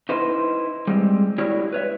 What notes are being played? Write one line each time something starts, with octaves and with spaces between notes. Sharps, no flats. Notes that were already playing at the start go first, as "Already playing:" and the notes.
D#4 E4 B4 C5
G3 G#3 C4
E4 F#4 G4 A#4 C#5 D5
B4 C#5 E5